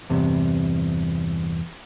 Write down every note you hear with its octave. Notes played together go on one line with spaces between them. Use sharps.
E2 G2 C3